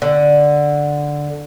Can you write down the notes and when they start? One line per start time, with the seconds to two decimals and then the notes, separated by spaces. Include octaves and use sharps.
0.02 D3